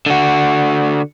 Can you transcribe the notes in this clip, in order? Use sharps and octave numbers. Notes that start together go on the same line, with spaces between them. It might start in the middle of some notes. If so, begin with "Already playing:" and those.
D3 F#4